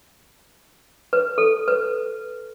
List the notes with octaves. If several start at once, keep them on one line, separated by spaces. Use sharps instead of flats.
B4
A4
B4